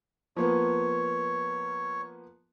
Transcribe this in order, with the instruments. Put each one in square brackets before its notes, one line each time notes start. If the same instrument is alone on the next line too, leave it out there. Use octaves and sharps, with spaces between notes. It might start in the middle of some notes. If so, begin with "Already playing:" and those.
[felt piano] F3 A#3 B3 [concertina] C#5